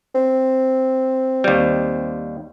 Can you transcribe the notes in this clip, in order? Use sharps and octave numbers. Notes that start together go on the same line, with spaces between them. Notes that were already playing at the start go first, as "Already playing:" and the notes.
C4
D#2 G3